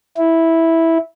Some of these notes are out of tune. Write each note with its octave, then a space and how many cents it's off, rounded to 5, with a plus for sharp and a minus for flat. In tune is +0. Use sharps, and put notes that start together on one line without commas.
E4 -5